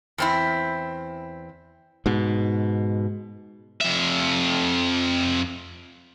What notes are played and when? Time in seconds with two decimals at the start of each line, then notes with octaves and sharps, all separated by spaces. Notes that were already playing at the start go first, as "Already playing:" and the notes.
0.18 E2 C4 E4
2.06 G#2 B2
3.81 F2 E5